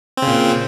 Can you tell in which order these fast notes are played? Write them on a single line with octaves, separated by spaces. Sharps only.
C4 C#3 A#2